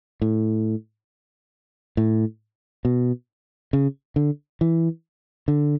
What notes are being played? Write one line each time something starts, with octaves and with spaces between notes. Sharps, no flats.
A2
A2
B2
C#3
D3
E3
D3